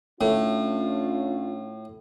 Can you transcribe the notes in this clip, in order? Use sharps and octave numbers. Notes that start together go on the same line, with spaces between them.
A2 C#4 D4 F4